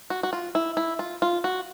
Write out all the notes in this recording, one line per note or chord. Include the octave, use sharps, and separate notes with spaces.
F#4
F#4
F4
E4
E4
F4
F4
F#4